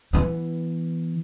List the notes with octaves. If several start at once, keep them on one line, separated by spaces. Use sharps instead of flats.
E3 B3